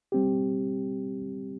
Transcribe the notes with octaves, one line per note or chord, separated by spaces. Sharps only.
G3 C4 G4